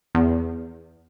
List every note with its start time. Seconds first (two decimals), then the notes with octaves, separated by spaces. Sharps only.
0.15 E2